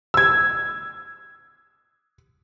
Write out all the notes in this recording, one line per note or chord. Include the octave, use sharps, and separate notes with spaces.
E6 G#6